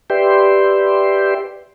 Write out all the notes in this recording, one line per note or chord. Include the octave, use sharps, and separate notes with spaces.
G4 B4 D5 E5 G5 C6